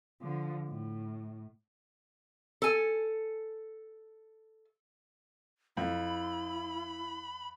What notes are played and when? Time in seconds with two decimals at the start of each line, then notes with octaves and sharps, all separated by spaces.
0.21 D3 F3
0.68 A2
2.62 A4 G#5
5.77 F2 E4 B5